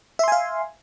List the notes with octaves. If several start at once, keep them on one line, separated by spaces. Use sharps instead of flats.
E5 F5 G#5 C6